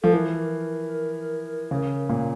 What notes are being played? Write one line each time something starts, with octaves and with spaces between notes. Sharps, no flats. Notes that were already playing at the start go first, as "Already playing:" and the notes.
F3 A4
E3 A#4
C#3
A#2